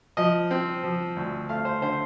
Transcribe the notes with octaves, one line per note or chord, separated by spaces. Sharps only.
F3 D#5
C4
F3
D2
A3 F5
C5
D3 C5